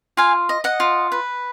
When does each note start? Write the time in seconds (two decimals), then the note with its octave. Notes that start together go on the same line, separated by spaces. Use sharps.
0.17 F4 F5 G#5
0.49 D#5
0.64 D#5 F#5
0.80 F4
1.12 B4